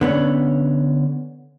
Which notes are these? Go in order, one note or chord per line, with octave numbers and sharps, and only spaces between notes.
D3 B3 C#4